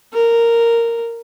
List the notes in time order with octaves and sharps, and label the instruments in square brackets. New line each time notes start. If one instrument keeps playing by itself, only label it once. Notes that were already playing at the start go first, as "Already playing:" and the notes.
[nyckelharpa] A#4